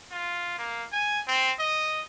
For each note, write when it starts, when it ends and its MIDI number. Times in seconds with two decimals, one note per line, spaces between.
0.12 0.56 65
0.59 0.84 58
0.93 1.20 80
1.27 1.51 60
1.59 2.02 75